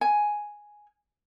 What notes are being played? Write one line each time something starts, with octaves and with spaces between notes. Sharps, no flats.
G#5